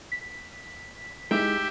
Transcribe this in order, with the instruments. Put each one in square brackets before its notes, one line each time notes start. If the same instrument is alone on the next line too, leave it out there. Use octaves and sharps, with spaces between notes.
[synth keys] B6
[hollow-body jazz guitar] G#3 D#4 E4 [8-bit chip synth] G4 E5 G5